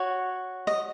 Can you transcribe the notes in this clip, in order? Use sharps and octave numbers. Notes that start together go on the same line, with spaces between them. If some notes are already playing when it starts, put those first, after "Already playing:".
Already playing: F#4 C#5
D#5